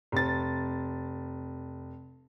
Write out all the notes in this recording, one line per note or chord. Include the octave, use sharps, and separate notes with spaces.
F1 A6